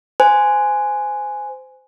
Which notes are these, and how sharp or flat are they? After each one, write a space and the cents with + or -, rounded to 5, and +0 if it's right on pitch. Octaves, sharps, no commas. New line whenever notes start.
C5 -20 G#5 +0